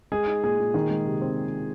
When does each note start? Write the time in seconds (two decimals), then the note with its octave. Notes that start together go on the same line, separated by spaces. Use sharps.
0.12 G#3 G#4
0.27 D#4
0.43 A#2 G#4
0.59 A#2
0.74 D#3
0.90 G#3
1.05 C3
1.21 C4